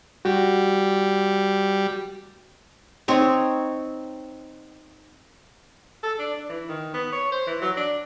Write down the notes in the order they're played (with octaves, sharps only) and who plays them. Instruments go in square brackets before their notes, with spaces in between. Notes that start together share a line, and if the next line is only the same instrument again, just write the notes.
[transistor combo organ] G3 [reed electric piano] F#4
[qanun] C4 D#4 C#5
[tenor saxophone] A4
D4
D4
E3
D#3
B3
C#5
C5
E3
F#3
D4